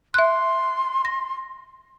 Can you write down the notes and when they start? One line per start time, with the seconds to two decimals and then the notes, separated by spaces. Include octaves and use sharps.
0.14 E5 C6 F#6
1.05 A#6